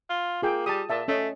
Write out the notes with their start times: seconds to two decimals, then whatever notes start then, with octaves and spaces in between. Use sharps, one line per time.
0.09 F4
0.42 A#3 F4 G#4 G5
0.66 G3 A5 D#6
0.90 A#2 E5 A5
1.08 A3 C#4 D#5